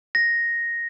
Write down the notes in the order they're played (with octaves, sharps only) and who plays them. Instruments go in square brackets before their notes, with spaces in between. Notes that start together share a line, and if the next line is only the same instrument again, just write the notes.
[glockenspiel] A#6